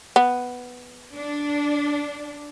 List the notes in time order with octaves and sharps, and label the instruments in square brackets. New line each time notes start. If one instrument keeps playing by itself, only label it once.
[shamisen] B3
[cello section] D4